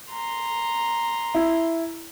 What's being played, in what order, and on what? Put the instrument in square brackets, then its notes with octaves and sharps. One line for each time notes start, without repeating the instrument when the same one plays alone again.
[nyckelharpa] A#5 C6
[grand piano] E4